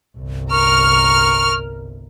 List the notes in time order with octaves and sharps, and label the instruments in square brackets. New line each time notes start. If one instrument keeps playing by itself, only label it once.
[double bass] G1 C2
[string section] A#4 F6 [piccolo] C#6